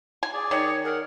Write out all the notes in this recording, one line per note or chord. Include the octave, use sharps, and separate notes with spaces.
G#5
G#4 D5
D#3 C#5
G#4 A#4 F#5